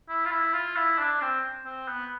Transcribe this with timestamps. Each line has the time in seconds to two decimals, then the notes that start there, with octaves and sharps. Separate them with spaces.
0.09 E4
0.25 F4
0.31 E4
0.53 F4
0.76 E4
0.99 D4
1.22 C4
1.66 C4
1.88 B3